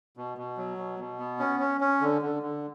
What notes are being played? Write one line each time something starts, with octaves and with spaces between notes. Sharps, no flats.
B2
B2
F#3
B2
B2
B3
C#4
C#4
C#4
D3
D3
D3